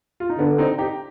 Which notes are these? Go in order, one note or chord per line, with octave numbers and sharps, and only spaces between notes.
F4
D#4
D3 B3 D4
C4 D#4
D#4 G4